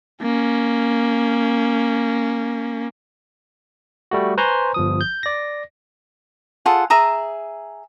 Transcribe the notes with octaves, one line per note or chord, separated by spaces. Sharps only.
A#3 C#4
G3 A3 F#4
B4 C5 G#5 A#5 C6 C#6
G1 F3 D#6
G6
D5 A#6
F4 G#4 A4 F#5
G#4 E5 A#5 D#6